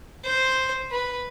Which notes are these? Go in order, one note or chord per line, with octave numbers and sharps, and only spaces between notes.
C5
B4